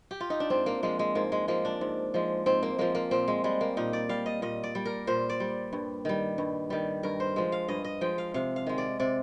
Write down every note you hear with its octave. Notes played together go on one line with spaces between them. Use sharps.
G4
F4
D#4
D4
G#2 C4
A#3
F3 G#3 A#3
G#3
G#2 A#3
G#3
F3 G#3 A#3
D4
G#2
F3 G#3
G#2 C4
A#3
F3 G#3 A#3
A#3
A#2 C4
G#3
G3 G#3
A#3
A#2 D#4
D5
G3 F5
D#5
A#2 D#5
D5
G3
A#4
A#2 C5
D5
G3
G2
D#3 G3
G2
D#3 G3
G2 A#4
C5
F3 G#3
F5
G2 D#5
D#5
F3 G#3 G5
F5
C3 F5
F5
D#3 G#3
D5
C3 D5